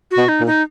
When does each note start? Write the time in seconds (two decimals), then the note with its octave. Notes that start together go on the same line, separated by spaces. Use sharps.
0.11 F#4
0.17 B2
0.29 D#4
0.41 A#2
0.47 D#4